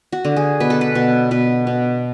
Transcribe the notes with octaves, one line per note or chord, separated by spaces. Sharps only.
F#4
D3
G#4
B2 B4
A4
B4
B2
B2 B4
B2